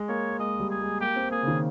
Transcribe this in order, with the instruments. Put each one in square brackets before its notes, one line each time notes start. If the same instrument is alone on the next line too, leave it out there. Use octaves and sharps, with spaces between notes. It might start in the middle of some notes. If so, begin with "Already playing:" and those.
Already playing: [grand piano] G#3
[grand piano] A#3 [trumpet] C#5
[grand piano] G#3 [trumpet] D#5
[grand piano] G3
[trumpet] G#4
[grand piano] G#3
[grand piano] A#3 [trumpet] G4
[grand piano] C4
[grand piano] A#3 [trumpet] G#4
[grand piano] C#3
D#3